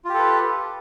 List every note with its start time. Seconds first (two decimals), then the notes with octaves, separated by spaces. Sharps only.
0.05 F4
0.09 G4
0.14 A4
0.19 B4